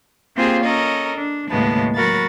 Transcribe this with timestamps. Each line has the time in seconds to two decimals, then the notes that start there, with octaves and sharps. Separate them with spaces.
0.35 A#3 C4 F4 G4 G#4 C5
0.64 C#4 A4 A#4 D#5
1.16 D4
1.50 D#2 A2 C#3 G#3 B3 A5
1.96 F#3 F#4 A#4 B5 A6